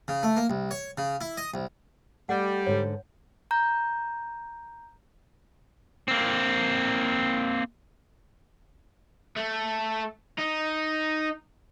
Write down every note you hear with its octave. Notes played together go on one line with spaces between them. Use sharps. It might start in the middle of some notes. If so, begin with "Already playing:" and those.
C#3
A3
A#3
C2
C#5
C#3
E4
D#5
C2
G3 A3 D#5 F#5
G#2 D3 A4 C#5
A#5 G6
A#3 C4
A3
D#4